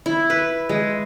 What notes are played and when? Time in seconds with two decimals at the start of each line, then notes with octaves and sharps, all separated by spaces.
0.06 E4
0.30 B4
0.69 G#3